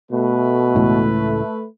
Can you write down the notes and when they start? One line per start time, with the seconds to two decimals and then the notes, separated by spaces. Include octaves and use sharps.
0.12 B2 A3 B4
0.75 C#2 A2 E3